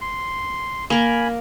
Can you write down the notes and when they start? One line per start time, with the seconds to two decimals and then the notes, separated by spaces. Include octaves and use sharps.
0.01 C6
0.90 A#3 A#4 G#5 B5